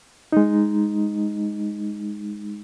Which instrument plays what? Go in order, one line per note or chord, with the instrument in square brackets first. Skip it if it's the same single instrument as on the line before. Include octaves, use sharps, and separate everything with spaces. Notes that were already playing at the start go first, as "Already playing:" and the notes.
[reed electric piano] G#3 D#4